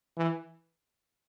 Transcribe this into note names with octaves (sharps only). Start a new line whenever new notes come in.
E3